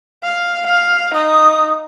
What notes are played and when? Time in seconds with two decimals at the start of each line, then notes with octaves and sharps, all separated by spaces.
0.23 F5
0.67 F5
1.14 D#4 D#6